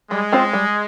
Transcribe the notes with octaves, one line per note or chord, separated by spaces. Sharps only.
G3 G#3
C4 F4 C5
G3